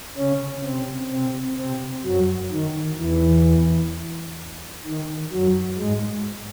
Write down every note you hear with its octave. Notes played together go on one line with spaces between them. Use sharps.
C#3 C#4
C3 C4
C3 C4
C3 C4
F#2 F#3
D#3
E2 E3
D#3
F#2 F#3
G#2 G#3